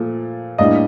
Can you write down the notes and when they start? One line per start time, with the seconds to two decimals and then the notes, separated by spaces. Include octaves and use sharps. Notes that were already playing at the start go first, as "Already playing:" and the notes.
Already playing: A#2 F3 A3
0.58 A2 G3 A#3 D4 D#5